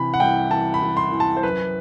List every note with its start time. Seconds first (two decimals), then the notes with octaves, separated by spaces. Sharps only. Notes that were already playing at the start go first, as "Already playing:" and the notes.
Already playing: C3 E3 B5
0.14 F#5
0.20 C2 G5
0.51 E3 A5
0.74 B5
0.82 E3
0.97 C6
1.12 E3
1.20 A5
1.37 C5
1.43 F#2 B4